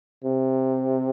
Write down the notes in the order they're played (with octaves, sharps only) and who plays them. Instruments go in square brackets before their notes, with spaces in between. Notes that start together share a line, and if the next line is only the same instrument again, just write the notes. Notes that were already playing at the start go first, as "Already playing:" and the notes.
[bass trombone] C3